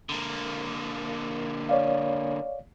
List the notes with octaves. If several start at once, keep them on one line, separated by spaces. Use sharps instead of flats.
D3 A#3
C#5 D5 F5